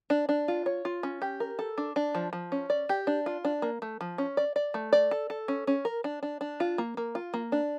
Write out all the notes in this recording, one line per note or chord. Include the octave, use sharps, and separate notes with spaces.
D4
D4
F4
C#5
F4
C#4
G4
A#4
A4
D4
D4
F3
F3
C#4
D5
G4
D4
F4
D4
A#3
A3
F3
C#4
D5
D5
A3
D5
A4
A4
C#4
C#4
A#4
D4
D4
D4
F4
A#3
A#3
F4
A#3
D4